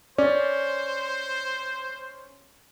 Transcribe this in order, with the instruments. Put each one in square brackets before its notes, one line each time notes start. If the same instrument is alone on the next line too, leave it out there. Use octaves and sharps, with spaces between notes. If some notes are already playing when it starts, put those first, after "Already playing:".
[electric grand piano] C#4 [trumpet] C5 [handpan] D5